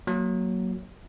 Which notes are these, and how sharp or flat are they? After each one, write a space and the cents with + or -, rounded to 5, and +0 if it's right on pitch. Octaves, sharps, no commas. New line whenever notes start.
F#3 +5 A#3 +0